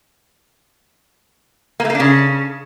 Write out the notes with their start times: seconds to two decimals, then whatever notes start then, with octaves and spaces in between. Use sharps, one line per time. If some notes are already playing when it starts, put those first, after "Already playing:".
1.80 A#3
1.85 A3
1.90 A#3
1.95 D4
2.00 C#3